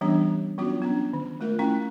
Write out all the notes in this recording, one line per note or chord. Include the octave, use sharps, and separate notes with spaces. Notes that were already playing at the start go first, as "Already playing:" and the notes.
E3 G3 B3 C#4 D4 G4
F#3 B3 C#4 D4 F4 F#4
B3 C#4 D4
D#3
G#3 A3 F4 A#4
A3 C#4 E4 G5